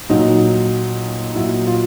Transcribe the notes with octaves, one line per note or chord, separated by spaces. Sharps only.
A#2 F#3 D#4
A#2 F#3 E4
F4